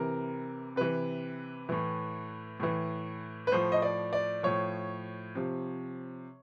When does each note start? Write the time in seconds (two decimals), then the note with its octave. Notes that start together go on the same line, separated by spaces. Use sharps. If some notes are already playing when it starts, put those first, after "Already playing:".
Already playing: C3 E3 A#4
0.76 C3 E3 B4
1.69 A2 E3
2.60 A2 E3
3.47 B4
3.52 A2 F3 C5
3.72 D#5
3.82 D5
4.13 D5
4.43 A2 F3 C#5
5.35 C3 F3